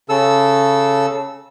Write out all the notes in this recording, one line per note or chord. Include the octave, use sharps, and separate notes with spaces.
C#3 A4 E6